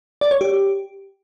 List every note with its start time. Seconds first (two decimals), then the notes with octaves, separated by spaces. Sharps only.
0.21 D5
0.31 C#5
0.41 G4